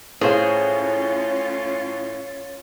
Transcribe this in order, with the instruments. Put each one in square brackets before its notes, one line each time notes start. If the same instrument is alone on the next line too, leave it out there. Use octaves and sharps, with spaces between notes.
[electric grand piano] A2 [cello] C#4 F4 [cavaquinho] G#4 C5 [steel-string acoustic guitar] C#5 F5